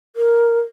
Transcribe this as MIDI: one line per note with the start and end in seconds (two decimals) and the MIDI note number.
0.16 0.59 70